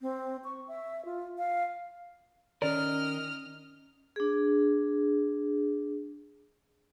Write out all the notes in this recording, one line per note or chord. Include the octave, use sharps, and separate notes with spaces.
C4
C#6
E5
F4
F5
D#3 C#4 A#4 D5 D#5 F6
D4 G#4